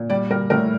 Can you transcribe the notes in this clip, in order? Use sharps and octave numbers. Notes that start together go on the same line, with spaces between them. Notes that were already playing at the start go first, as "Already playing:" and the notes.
Already playing: A#2
G3 D5
G3 A#4
A2 A#4